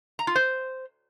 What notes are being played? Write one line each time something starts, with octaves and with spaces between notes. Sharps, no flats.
A#5
F4
C5